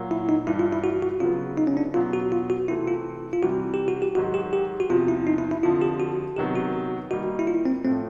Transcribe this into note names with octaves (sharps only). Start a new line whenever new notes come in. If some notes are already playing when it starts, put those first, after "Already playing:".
Already playing: A#2 F#3 A#3
E4
D#4
G2 E3 G3 E4
F4
E4
F#4
F#4
C#3 F#3 B3 F4
D#4
C#4
D4
E2 B2 F#3 B3 F4
F#4
F4
F#4
C3 E3 A3 C4 E4
F4
F4
C3 E3 G3 F#4
G4
F#4
G4
G#2 D#3 F#3 F#4
G4
G4
F#4
E2 C3 F3 F4
E4
D#4
E4
E4
F2 D3 F3 F4
G4
F#4
C3 D#3 F#3 B3 G4
F#4
D#3 G3 A#3 D#4 F#4
E4
F4
C4
A2 F3 A3 C4